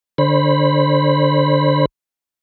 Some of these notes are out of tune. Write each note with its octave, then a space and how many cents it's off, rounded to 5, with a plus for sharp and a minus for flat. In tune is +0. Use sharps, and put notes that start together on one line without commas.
D3 +0 C5 +25 B5 +0